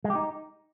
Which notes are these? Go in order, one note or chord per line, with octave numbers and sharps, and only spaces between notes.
G#3
G4
D#4